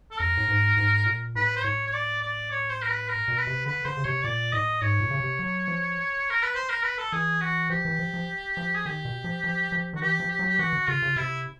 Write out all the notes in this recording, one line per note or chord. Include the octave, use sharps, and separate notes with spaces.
A4
F2 A#4
A2
G#2
G#2
A#2
A2 B4
C5
A2 C#5
C#5
D5
D5
C#5
C5
A#4
B4
A#4
B2
B4
C3
D3 B4
D3 C5
C#3
C3 C#5
A#2 D5
A2 D#5
G#2 C#5
A#2
C#3
C3
F#3
F3
A#4
B4
C5
A#4
B4
A4
E3 G#4
F#4
F3 G4
E3
F3
F3
F3
G#4
D#3 G4
B2
F3
F3
F3
D#3 F#4
E3 G4
F3
G4
F#3
G4
E3 F#4
D3
C#3 F4
C#3
C3 E4